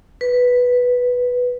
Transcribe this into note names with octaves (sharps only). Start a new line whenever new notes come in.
B4